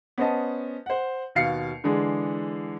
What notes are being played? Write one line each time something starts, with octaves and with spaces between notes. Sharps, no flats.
B3 C#4 C5 D#5 A5
C5 F#5
D#2 B2 F5 C7 C#7
D3 E3 G#3 D4 G#4